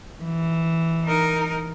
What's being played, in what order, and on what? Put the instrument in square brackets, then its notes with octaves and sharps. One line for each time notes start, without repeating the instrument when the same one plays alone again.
[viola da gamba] E3
[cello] D#4 A#4